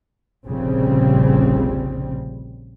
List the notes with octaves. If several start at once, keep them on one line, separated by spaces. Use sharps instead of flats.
F1 A#1 C#3 G3 C4